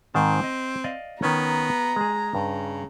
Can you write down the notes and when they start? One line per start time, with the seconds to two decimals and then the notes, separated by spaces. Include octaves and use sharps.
0.14 G#2 D#3 C4 A5
0.44 D#5
0.84 D5 D#5 F5
1.23 D#3 B3 C#4 A#5
1.96 G#3 G#4
2.35 G2 C#3